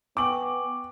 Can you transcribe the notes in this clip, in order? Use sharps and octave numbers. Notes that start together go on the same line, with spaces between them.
B3 G5 G#5 C#6 D6 F#7